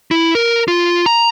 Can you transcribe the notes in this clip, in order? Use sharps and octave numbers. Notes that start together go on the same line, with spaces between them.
E4
A#4
F4
A#5